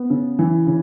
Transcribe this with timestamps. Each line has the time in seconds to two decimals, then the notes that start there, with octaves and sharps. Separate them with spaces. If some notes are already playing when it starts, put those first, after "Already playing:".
Already playing: B3
0.10 C#3
0.39 E3
0.67 C#3